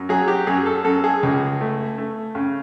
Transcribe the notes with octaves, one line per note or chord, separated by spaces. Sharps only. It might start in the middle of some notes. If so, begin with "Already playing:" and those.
Already playing: F#2
F#3 G#4
G4
F#2 G#4
A4
F#2 A4
G#4
C#2 G#4
A3
A3
C#3